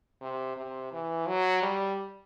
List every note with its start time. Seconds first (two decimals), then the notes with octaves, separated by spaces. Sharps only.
0.21 C3
0.57 C3
0.92 E3
1.27 F#3
1.63 G3